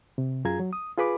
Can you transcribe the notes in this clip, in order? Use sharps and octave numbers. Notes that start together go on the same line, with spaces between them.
C3
F#2 F4 G#4 A#5 G#6
F#3
D#6
F4 G#4 B4 B5 D6